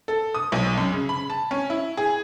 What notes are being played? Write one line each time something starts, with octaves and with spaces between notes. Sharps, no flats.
A4
D#6
B1
F#2
C#3
B5
A5
C#4
E4
G#4